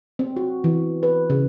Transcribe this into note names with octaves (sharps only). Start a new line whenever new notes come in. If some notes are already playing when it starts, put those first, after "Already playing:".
C4
F#4
E3
B4
C#3